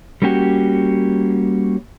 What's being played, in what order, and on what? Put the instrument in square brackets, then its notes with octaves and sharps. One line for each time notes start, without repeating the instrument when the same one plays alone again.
[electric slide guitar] G3 A#3 C#4 F#4 G4